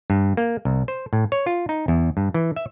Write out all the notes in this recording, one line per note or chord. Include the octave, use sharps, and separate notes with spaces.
G2
A#3
C2
C5
A2
C#5
F4
D#4
E2
G2
E3
E5